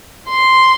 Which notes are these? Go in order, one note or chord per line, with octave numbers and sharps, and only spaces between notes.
C6